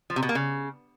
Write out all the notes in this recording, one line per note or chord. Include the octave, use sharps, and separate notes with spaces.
F3
C3
B2
A#3
C#3